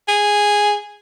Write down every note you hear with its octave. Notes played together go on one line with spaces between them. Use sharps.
G#4